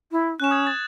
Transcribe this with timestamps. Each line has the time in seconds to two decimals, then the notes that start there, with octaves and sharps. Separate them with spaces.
0.12 E4
0.40 C#4 F#6 E7
0.51 D#6 G#6
0.67 A6